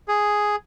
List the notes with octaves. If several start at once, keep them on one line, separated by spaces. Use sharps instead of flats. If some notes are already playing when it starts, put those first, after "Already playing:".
G#4